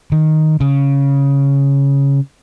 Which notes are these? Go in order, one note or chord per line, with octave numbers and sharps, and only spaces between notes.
D#3
C#3